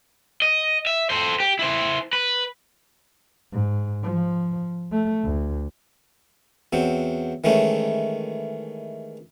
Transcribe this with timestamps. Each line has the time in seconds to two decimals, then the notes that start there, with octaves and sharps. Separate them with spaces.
0.42 D#5
0.87 E5
1.10 A4 C5
1.40 G4
1.59 E4 C5
2.13 B4
3.52 G#2
4.03 F3
4.92 A3
5.24 D2
6.73 E2 F#3 C4
7.44 D#3 E3 G#3 A3 C#4